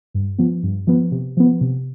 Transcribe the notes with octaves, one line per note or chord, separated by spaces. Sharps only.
G2
F3 B3
G2
F3 B3
C3
F3 B3
C3